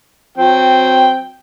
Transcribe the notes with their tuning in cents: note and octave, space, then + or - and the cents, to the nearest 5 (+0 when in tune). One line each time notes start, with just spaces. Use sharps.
F#3 -25 C4 -10 G5 +0